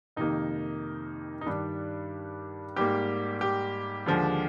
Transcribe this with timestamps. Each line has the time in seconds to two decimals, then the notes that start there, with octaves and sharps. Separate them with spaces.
0.16 F2 C3 D#3 A#3 D#4
1.41 D#4
1.46 G2 D#3 G3 D4
2.76 G#2 G3 A#3 G4
3.41 G4
4.06 D#2 D3 F3 G#3